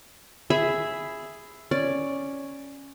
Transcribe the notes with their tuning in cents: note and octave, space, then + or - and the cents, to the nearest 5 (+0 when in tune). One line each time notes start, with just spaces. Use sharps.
G#4 +0 E5 +0 B5 +10
C#4 +0 D5 +0